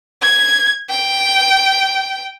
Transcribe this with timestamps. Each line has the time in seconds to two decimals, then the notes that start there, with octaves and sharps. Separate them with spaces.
0.22 G#6
0.90 G5